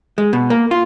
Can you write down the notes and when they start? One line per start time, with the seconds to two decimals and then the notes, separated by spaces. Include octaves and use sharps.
0.18 G#3
0.33 B2
0.50 A#3
0.71 F4